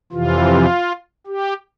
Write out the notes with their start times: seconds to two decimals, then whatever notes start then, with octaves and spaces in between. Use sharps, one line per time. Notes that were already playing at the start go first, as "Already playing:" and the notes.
0.12 F2 C3 E3 F4
1.27 G4